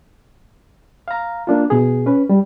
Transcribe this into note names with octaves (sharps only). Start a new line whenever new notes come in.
F5 A#5
A#3 D4 F4
B2 G#4
C#4 B4
G3